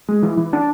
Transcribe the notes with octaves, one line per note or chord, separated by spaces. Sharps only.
G#3
E3
E3
D4